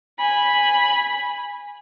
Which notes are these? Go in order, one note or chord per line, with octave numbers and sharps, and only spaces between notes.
G#5 B5